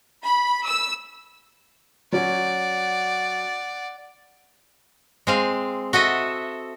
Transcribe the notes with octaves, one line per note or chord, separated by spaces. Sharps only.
B5
E6
F#3 C#4 F#4 D5 F#5
G#3 C4 F5
F#4 A4 D#5 E5